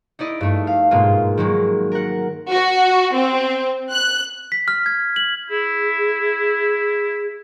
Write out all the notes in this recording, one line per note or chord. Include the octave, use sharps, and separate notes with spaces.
D#4 E4 D5 D#5
G2 A3
F5
G#2 B2 G#3 A#3 F4
D#3 F#3 G#3 A#3
A#4 F#5
F#4
C4
F#6
B6
F6
G#6
F#7
E4 G#4